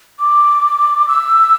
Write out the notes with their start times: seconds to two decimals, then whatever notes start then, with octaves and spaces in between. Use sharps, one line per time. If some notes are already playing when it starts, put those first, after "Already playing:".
0.19 D6
1.08 E6